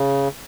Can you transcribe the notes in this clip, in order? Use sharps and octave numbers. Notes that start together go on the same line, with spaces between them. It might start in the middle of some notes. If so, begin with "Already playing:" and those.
Already playing: C#3